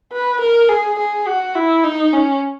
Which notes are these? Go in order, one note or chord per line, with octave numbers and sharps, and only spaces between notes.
B4
A#4
G#4
G#4
F#4
E4
D#4
C#4